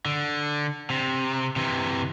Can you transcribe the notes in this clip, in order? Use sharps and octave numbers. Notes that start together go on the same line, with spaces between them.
D3
C3
C3 E3